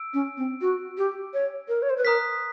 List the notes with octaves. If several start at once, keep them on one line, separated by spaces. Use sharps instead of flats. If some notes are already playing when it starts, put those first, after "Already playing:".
Already playing: E6 D7
C#4
C4
F#4
G4
C#5
A#4
C#5
C5
B4
A#4 A#5 D#6 F#6 B6